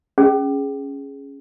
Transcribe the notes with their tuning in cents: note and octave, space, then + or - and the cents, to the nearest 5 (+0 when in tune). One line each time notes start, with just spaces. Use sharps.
C#4 +0 G#4 +0